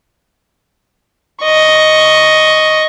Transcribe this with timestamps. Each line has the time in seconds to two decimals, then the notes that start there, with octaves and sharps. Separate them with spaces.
1.43 D#5 C#6